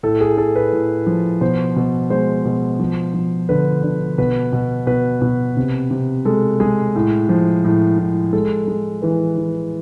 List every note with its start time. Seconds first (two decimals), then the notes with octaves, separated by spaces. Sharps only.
0.03 A2 A4
0.21 G#4
0.37 A2 A4
0.56 B4
0.73 A2
1.06 F3
1.41 B2 C5
1.76 B2
2.10 G#3 C5
2.45 B2
2.79 F3
3.14 F3
3.49 D3 B4
3.83 D3
4.18 B2 B4
4.53 B2
4.87 B2 B4
5.22 B2
5.57 C3
5.91 C3
6.25 G#3 A4
6.60 G#3 G#4
6.96 A2
7.29 F3
7.65 A2
7.98 A2
8.33 G#3 A4
8.68 G#3
9.02 E3 B4
9.38 E3